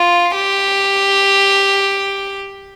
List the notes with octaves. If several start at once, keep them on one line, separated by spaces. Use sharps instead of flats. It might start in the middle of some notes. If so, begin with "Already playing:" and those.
Already playing: F4
G4